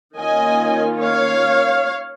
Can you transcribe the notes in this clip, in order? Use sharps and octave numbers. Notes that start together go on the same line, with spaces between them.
D#3 A#3 C#4 F4 D#5 G#5
C#5 F5